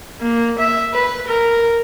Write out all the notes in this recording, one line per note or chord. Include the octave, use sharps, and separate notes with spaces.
A#3
E5
B4
A#4